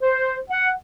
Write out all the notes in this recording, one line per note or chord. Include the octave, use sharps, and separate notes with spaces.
C5
F#5